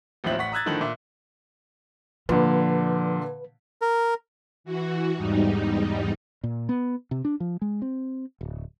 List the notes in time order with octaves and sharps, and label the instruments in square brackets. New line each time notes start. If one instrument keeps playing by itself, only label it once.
[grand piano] A1 D#2 F3 C4 E5 F#7
A1 F#5 C#6 B6
A#5 D#6 E6 F#6 G#6 A6
A2 D3 D#3 F3 A4 F#7
A#2 E5
[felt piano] A#2 D3 [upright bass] F3 [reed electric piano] B4
[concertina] A#4
[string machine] E3 F#4
E2 G#2 G3 D#4
[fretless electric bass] A#2
B3
C3
D4
F3
G#3
C4
D1